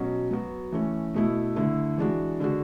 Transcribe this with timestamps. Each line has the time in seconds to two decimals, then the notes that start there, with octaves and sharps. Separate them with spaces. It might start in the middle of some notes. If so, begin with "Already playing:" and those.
Already playing: B2 F#3 C#4 F#4
0.31 F#3 B3 F#4
0.72 E3 A3 C#4
1.14 B2 A3 E4
1.56 D3 A3 E4
1.98 E3 G#3 D4 F#4
2.40 D3 G#3 D4 F#4